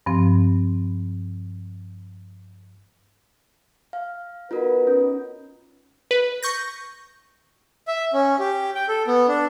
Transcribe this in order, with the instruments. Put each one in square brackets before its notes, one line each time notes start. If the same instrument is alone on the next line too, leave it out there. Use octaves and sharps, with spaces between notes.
[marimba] G2 F3 C4
[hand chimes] F5
[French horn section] B3 D#4 B4 [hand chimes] F4 F#4 A#4
[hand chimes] C#4
[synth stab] B4
C#6 G6 A#6
[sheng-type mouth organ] E5
C#4
G4
G5
A4
B3
D4